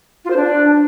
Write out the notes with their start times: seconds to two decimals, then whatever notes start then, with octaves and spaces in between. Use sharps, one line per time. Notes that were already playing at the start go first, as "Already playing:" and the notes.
0.24 F4
0.30 C5
0.36 D4